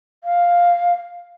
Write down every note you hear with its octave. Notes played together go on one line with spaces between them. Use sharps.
F5